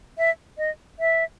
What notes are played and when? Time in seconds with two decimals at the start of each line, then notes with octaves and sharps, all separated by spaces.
0.18 E5
0.58 D#5
0.99 E5